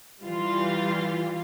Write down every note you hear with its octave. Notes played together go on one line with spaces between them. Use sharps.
E3 G3 F4